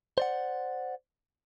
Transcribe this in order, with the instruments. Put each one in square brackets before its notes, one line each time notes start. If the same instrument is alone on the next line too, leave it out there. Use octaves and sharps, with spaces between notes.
[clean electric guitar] C5 D5 F#5